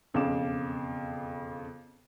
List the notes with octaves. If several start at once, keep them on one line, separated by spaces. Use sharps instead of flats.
E1 F2 C#3 F5 D6 E7